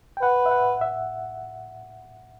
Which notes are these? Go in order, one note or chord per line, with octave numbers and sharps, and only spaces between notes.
G5
B4 F#5
E5
F#5
E5